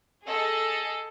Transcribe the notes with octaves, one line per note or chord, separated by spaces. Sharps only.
G#4 A4 D#5